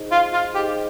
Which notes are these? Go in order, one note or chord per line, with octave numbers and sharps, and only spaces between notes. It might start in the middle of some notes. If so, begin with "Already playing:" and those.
Already playing: D#4 G#4 C5 D#5
F4
F4
D#4 G4 G#4 C5 D#5